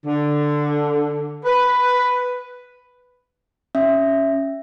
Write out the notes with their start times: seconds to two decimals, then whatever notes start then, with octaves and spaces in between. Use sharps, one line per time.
0.06 D3
1.44 B4
3.75 C#4 E5